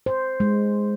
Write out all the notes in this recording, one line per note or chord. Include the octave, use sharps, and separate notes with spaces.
C5
G#3